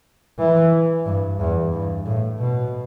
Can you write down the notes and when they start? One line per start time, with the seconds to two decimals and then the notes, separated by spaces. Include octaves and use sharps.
0.39 E3
1.06 G2
1.40 E2
1.73 G2
2.06 A2
2.40 B2